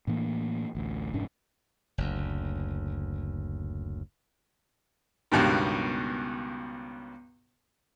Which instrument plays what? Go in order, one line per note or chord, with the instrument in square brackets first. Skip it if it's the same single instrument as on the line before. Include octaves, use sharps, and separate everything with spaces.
[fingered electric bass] A2 E3 A#3 D4
A1 D2
F1 G#2 C#4 D4
[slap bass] F#1 D2
[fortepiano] C#2 G2 B2 D#3